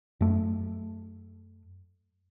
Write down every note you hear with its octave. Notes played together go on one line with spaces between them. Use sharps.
F#2 A3